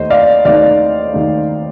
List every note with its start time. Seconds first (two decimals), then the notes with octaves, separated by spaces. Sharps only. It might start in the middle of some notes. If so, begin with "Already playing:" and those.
Already playing: D#2 D#3 A3 D#4 C5 D#5
0.10 D5 F5
0.45 D#2 D#3 A3 D#4 D5 F5
1.14 D#2 D#3 A3 D#4